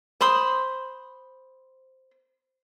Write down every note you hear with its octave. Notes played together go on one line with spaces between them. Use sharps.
C5 B5 C6 D#6